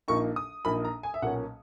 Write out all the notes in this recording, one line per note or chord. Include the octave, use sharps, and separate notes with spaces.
A#1 A#2 A#3 D#4 C#6
D#6
A#1 A#2 A#3 D#4 B5
A#5
G#5
E5
B1 A#2 A#3 C#4 F#5